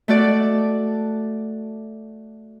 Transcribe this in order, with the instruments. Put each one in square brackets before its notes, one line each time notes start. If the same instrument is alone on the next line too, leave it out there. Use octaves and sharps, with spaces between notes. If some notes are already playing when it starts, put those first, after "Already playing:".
[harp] A3 F#4 D5